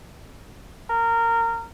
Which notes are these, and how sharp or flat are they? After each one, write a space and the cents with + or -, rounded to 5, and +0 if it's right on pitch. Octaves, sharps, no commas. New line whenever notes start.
A#4 -20